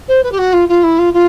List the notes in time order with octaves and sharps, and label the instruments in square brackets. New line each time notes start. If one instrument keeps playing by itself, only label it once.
[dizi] C5
B4
G4
F#4
F4
F4
E4
F4
F4